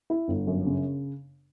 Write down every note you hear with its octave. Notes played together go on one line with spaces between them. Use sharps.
E4
G1
F#2
C#3